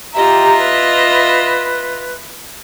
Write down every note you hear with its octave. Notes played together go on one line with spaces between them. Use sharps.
F4 G4 D#5 E5 A#5
B4